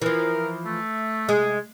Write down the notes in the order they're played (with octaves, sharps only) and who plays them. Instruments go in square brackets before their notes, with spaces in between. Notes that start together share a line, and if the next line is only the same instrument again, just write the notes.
[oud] E3 F3 [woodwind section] A#4
[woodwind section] A3
[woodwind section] C3 G#5 [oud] G#3